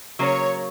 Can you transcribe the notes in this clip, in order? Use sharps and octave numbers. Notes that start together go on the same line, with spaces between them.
C#3 F#3 A#3 C#5